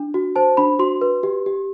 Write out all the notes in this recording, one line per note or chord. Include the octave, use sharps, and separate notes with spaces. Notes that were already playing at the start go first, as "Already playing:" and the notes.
Already playing: D4
F#4
C5 A5
D4 B5
F#4 C6
B4
G4
G4